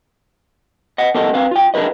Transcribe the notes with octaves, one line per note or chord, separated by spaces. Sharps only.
D#5 F#5
B3 G4 A4 A#4 D#5
C4 B4 F5
F4 G5
D4 G#4 A#4 B4 D#5